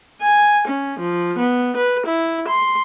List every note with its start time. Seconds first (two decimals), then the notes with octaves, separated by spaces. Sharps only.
0.21 G#5
0.67 C#4
1.00 F3
1.38 B3
1.77 B4
2.06 E4
2.48 C6